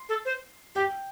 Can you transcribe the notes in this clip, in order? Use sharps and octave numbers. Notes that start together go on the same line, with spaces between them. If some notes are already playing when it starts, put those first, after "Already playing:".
Already playing: C6
A4
C5
G4 G5